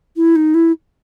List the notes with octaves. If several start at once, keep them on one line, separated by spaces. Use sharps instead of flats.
E4
D#4
E4